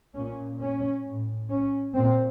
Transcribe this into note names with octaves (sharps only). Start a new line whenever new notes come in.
A#2 C#4
C#4
A2
C#4
A#2 C4